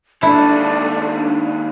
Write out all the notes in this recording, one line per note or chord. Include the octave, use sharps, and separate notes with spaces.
D#2 D4 E4 A4